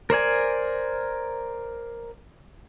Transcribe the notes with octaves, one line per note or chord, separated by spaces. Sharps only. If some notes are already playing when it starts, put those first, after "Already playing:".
A#4 C5 D5 G#5